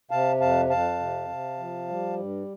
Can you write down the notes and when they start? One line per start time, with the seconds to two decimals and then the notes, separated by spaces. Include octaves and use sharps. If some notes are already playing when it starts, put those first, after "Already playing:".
0.11 C3 F5 A5
0.40 F2 F5 A5
0.70 F2 F5 A5
1.00 C3
1.29 C3
1.59 F3
1.88 G3
2.18 G2